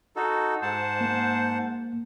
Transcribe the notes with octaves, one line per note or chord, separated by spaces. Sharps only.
D#4 F#4 A4
G#2 C5 F#5 A5
A#3